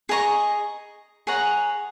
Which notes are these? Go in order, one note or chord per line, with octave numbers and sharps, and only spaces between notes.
G#4 D#5 A#5 C#6
G#4 C#5 F#5 A#5